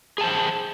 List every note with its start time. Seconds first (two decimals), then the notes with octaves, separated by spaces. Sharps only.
0.18 G#4
0.21 A5
0.24 C5